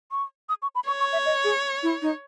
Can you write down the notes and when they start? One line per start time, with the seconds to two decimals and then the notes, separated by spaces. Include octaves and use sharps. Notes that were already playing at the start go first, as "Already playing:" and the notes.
0.11 C#6
0.49 D#6
0.62 C#6
0.75 B5
0.87 C#5 C#6
1.00 C#6
1.13 E5
1.26 D#5
1.44 G#4
1.83 E4
2.02 D#4